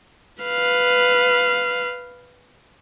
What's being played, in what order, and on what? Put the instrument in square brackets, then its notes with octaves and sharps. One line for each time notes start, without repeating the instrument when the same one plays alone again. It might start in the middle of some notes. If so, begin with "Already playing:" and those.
[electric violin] B4 F5